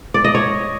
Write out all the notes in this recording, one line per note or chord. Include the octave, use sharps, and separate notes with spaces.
D5
D#5
C#5